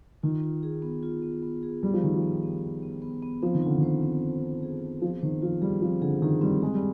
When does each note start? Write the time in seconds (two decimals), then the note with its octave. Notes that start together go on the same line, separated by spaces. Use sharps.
0.23 D#3 F4
0.43 F4
0.63 G#4
0.82 B3
1.03 F4
1.22 B3
1.42 B3
1.63 G#4
1.82 G3 F4
1.94 F3
2.03 D#3 F4
2.15 F3
2.23 B3
2.43 B3
2.62 F4
2.83 B3
3.02 B3
3.23 B3
3.42 F3 C4
3.54 D#3
3.62 D3 F4
3.78 D#3 C5
4.02 C4
4.22 C5
4.42 C4
4.63 G#4
4.82 G#4
5.02 F3 G#4
5.22 D#3 C5
5.42 F3 F4
5.62 G3 G#4
5.82 F3 C4
6.01 D3 G#4
6.22 D#3 G#4
6.41 G3 C4
6.62 G#3 G#4
6.74 G3